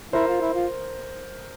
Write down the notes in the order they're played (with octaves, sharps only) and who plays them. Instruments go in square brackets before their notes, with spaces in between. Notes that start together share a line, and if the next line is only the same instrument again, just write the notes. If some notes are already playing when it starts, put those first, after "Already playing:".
[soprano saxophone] E4 [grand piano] A#4 C5
[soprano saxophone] F4
E4
F4